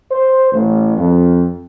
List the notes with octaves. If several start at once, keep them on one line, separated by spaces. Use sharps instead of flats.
C5
A1
F2